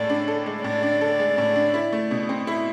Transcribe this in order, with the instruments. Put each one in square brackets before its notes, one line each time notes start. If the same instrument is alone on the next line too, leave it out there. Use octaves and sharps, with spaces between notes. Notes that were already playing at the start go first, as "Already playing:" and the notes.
Already playing: [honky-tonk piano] A2 G#3 A4 [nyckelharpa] D5
[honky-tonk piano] D4
A4
G#3
[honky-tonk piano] A2 [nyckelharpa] D5
[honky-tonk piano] D4
A4
G#3
A2
D4
E4
A3
B2
C4
E4